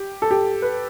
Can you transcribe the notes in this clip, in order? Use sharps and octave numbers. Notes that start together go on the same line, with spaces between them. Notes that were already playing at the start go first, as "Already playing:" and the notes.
Already playing: G4
A4
G4
B4